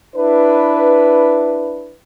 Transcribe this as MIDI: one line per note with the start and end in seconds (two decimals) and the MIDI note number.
0.15 1.95 62
0.15 1.95 64
0.15 1.95 71